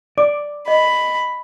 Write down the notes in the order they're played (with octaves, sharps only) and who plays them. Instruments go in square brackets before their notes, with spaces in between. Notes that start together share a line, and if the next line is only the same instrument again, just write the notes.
[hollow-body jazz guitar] D5 [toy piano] D6
[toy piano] D#5 [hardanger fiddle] B5